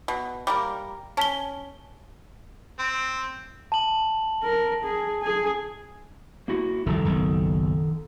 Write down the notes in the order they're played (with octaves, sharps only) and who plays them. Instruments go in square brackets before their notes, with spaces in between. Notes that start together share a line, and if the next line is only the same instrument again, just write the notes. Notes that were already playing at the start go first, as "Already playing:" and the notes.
[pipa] B2
[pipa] G3 A#3 A#4 [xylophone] D6
[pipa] C#4 [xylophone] A5 B6 G7
[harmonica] C4
[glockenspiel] A5 F#7
[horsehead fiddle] A#4
G#4
G#4 G#5
[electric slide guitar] A#3 E4 F#4
[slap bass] F1 C2 [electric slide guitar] D#3 A4 A#5
[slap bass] F#1 B1